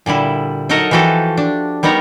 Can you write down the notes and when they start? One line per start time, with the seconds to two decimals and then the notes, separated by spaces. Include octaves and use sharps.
0.06 A#2 D3 G3 E4
0.69 F#3 D#4 A4 A#4 D#5 F#5
0.91 E3 F3 F#4 G4 A4
1.37 D4
1.83 G3 B3 D#4 A#4 C#5